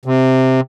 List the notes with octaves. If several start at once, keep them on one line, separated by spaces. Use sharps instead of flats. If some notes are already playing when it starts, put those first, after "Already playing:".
C3